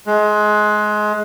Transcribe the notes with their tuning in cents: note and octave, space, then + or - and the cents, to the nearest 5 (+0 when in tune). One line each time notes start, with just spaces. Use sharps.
G#3 +25